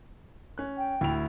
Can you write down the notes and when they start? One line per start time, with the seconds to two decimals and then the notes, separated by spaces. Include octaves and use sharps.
0.58 C#4 F#6
0.78 G5
1.01 D2 E4 F7